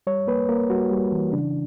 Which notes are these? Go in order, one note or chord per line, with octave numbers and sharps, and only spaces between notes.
G3 C#5
A#3 B4
A#3 A#4
G3 F#4
G3
E3
C#3 D4